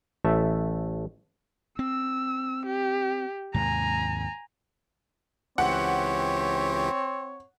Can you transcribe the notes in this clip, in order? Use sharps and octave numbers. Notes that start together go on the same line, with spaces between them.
A1 A3 E5
C4 E6
G4
D#2 G#2 C3 G#5 A#5
C#2 E3 C4 G4 C#5 F#5